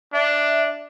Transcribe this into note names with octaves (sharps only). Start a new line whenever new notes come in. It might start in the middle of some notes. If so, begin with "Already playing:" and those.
D4 E5